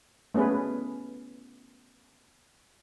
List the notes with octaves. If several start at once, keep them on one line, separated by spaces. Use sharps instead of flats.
A3 B3 C#4 G#4 B4